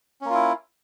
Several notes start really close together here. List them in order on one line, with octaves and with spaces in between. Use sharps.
C#4 A#3 F4 E4